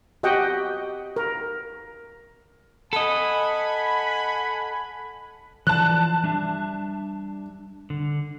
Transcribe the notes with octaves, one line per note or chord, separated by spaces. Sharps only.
F#4 G4 D#5 F#5 G5
A#4
A4 D#5 F#5 G#5 B5
E3 F3 D5 A5 F#6
G3 D4 E5
D3